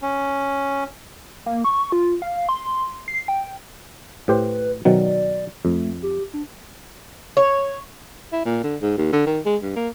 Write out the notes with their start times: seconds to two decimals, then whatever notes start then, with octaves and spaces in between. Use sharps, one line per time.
0.02 C#4
1.46 A#3
1.64 C#6
1.92 F4
2.22 F5
2.49 C6
3.08 C7
3.28 G5
4.28 A2 G4 B4 C5
4.85 B2 D#3 F#3 D5
5.65 F2 A3
6.03 G4
6.33 D4
7.37 C#5
8.33 E4
8.45 A#2
8.64 D3
8.81 G#2
8.98 D#2
9.12 D3
9.26 D#3
9.46 G#3
9.63 G2
9.76 A#3